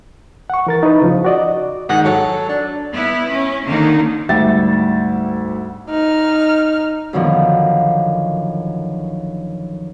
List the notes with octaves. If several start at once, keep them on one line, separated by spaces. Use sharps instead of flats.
F#5 C#6
E3 A#4 A6
D#4 E4 B4
C#3 F3
F#4 D5 D#5
G#2 D#3 F#5
F#3 A4 C#5 F#5
D4
B3 E4
C#4
D3 D#3 A#3 D#4
D2 G#2 G3 E5 G5 A6
D#4 F6
F#2 B2 D3 D#3 F3